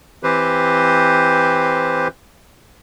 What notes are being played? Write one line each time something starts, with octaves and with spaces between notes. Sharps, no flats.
E3 C4 G4 B4 C5